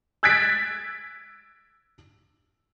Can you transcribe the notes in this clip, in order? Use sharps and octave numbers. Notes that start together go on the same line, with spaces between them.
E6 F#6 G#6 A6 B6 D7